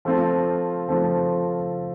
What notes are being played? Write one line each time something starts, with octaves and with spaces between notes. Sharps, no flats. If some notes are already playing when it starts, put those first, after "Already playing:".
F3 A3 C4 F4
F3 A3 C4 F4